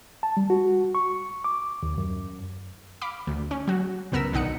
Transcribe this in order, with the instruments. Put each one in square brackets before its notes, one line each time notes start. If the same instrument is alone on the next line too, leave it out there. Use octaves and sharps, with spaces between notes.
[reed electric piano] A5
G3
F#4
C#6
D6
D#2
F#2
[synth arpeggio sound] F5 B5 D6
D2
C#4
F#3 F#4
C#2 F#2 B3 A#4 E6 B6
B1 D3 D#4 F#5 C#7